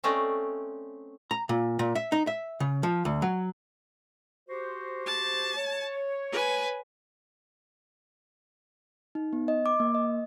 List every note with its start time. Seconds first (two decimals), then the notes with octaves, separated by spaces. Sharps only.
0.04 A3 C4 C#4 D5 D#5
1.31 A#5
1.49 A#2
1.79 A#2
1.95 E5
2.12 D#4
2.27 E5
2.60 C#3
2.83 F3
3.05 D2
3.22 F#3
4.49 F#4 G4 C5
5.06 A5
5.56 C#5
6.32 B4 G#5
9.15 D#4
9.33 B3
9.48 D#5
9.66 D6
9.80 A#3
9.95 D#5